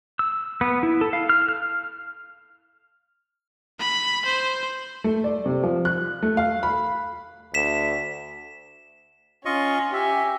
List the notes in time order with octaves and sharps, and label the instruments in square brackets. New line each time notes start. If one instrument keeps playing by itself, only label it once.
[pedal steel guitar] E6
B3
E4
A4
F5
F6
F6
[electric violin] B5
C5
[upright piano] A3
D5
C3
F3
F#6
A3
F5
B5
[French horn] D2 [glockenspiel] B6 E7
[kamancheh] C#4 [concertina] F4 D#5 C#6
[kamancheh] G4 G#5 [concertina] E5